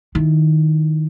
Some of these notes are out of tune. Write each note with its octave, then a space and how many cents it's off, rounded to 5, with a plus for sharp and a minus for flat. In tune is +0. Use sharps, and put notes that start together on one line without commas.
D#3 +0 E4 +0